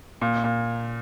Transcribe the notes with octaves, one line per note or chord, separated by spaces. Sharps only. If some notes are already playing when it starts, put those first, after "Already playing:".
A#2
A#2